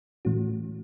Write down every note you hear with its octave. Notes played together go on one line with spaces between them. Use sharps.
A2 E3 A3 C#4 F#4